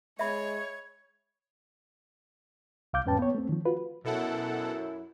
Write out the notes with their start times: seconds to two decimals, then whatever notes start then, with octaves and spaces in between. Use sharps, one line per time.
0.19 G#3 C#5 E5 B5 G#6
2.93 C2 F5 D6 G6
3.06 E2 G#2 C#4 B4 G5 A5
3.19 B3 C#5
3.35 A3 C4
3.49 D#3 F3
3.65 F4 F#4 B4
4.04 F#2 B2 E4 A4 F#5